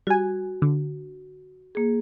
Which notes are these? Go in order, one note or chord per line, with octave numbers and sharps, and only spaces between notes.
G3 F#4 G#5
D3
A#3 G#4